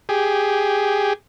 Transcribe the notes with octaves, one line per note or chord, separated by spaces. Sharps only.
G4 G#4